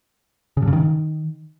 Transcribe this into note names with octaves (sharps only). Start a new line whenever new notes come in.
C#3
G2
C#3
D#3